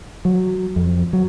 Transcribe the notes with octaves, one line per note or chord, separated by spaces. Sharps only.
F#3
F2
F#3